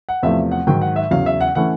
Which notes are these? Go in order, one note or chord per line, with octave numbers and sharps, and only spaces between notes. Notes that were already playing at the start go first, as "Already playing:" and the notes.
F#5
E2 C3 F3 A3 E5
F#5
G#2 D#3 F#3 G5
F#5
E5
E2 C#3 F#3 F5
E5
F#5
E3 A3 C#4 F#5